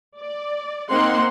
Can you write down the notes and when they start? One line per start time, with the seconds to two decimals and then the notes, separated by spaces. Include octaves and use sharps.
0.20 D5
0.91 A#3 C4 D#4 F#5 C6